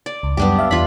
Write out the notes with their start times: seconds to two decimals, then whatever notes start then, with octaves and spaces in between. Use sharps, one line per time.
0.06 D5
0.23 C#2
0.37 F#2 G3 B3 D4 G4
0.58 E5 F5
0.71 E2 D4 F4 B5 B6